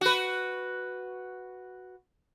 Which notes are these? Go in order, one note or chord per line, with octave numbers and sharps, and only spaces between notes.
F#4 B4